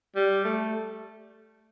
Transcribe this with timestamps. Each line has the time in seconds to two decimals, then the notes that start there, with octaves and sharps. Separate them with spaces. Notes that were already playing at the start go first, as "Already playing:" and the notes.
0.16 G3
0.45 A3